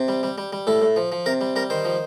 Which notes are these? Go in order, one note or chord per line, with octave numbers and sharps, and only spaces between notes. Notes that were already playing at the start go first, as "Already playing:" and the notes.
Already playing: C3
G3
G3
G3
G3
A2 A4
A2
F3
F3
C3 A#4
G3
G3 A#4
D#3 C5
F3